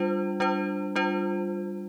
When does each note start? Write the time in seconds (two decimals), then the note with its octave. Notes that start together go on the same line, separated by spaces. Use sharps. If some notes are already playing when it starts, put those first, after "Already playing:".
Already playing: G3 D4 F4 C5
0.40 G3 D4 F4 C5
0.96 G3 D4 F4 C5